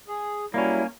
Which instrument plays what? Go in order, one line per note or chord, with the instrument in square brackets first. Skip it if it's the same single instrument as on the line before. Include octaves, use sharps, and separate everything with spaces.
[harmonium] G#4
[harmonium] F#3 G3 E4 [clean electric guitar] A#3 C#4